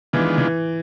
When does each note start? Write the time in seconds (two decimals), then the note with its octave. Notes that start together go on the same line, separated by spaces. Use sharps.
0.13 D#3 E3 G#3 B3 D4 F4
0.38 E3